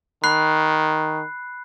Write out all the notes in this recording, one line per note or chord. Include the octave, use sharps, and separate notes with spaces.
D#3 B5 F#6 C7